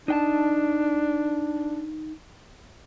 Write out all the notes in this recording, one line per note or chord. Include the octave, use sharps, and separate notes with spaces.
D4 D#4 G5 A5